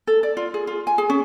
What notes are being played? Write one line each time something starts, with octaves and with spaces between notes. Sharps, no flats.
A4
D5
F4
G#4
F4
G#5
G#4
C#4